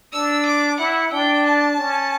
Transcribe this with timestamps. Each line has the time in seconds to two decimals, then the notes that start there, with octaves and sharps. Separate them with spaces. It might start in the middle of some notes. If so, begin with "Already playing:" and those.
0.13 D4 E6
0.46 D6
0.79 E4 F#5
1.12 D4 G5
1.46 A5
1.78 C#4